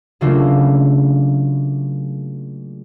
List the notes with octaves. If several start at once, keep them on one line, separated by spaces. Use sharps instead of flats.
C#3 F#3 A3 A#3 D4 F4